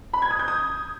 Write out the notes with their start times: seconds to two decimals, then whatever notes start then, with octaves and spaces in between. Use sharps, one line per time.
0.13 B5
0.22 G#6
0.31 D#6
0.39 G6
0.48 D#6